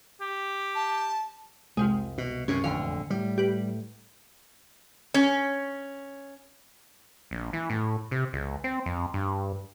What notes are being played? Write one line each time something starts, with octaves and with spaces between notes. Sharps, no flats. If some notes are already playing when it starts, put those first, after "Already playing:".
G4
A5
C2 F2 C3 G#3
B2
F#2 C3 C#4
E1 A1 F2 D3 F5
A2 G3
G4 B4
C#4
A#1
E3
A2
C3
C#2
C4
F2
G2